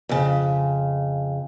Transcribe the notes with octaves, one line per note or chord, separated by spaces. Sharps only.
F2 C#3